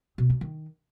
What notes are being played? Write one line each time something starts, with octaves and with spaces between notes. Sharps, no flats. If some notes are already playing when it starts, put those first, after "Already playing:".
B2
D4
D#3